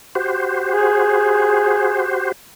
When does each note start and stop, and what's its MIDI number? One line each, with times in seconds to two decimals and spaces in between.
0.15 2.32 66
0.15 2.32 67
0.15 2.32 72
0.72 2.08 68